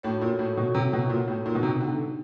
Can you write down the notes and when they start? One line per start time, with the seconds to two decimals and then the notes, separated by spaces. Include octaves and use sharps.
0.03 A2 D4 F#4 A4 C#5
0.21 A#2
0.39 A2
0.57 B2
0.75 C3
0.93 B2
1.10 A#2
1.28 A2
1.46 A#2 B3 D#4 G4
1.55 B2
1.63 C3
1.81 D3